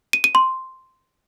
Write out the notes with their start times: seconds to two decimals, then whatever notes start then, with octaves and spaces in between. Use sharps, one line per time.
0.13 D#7
0.24 D#7
0.35 C6